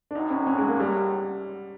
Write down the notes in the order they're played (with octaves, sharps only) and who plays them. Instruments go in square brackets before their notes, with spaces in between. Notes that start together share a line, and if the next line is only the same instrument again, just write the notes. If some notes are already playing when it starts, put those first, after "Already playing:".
[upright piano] D4
[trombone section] B1 A2 F#3 [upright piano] D#4
[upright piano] C#4
C#4
G#3
A#3
G3